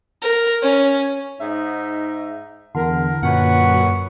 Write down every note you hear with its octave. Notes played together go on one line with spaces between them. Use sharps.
A#4
C#4
G#2 D#4 E5
E2 D3 A#4
F#2 A#2 B4 C#5 F#5